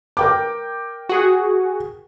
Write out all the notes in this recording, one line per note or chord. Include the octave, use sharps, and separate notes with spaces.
A#4 G5 D6
F#4 G#4